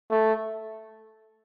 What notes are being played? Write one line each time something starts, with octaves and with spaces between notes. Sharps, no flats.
A3